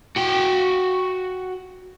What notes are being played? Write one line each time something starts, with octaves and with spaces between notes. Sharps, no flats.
F#4 G5